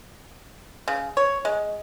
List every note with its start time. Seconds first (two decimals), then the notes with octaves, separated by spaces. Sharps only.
0.88 C#3
1.17 C#5
1.45 G#3